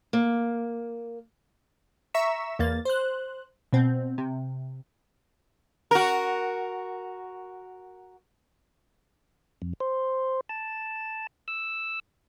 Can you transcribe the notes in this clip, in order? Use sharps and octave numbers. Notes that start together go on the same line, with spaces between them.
A#3
E5 A#5 C#6 B6 E7
E2 A#3 A6
C5 F#6
B2 C4
C3
F#4 A#4
F2
C5
A5
E6